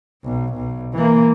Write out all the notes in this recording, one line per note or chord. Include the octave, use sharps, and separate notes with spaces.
B1
B1
E3 A#3